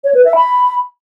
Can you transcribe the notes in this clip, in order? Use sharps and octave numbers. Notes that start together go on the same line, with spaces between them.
C#5
B4
E5
B5